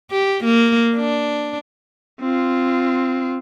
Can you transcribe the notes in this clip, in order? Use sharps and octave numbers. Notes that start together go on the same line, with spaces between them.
G4
A#3
D4
C4 F4